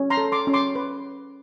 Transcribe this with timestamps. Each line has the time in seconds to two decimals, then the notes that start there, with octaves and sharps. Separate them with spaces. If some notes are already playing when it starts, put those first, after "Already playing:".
Already playing: C#4
0.10 A#5 C6
0.17 A4
0.32 C6 D6
0.47 C#4
0.53 C6 D6
0.75 B4